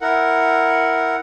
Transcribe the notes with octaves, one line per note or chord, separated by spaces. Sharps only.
E4 A#4 F#5